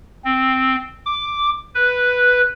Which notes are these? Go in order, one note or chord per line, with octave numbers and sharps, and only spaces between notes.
C4
D6
B4